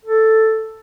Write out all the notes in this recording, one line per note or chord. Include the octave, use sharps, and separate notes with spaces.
A4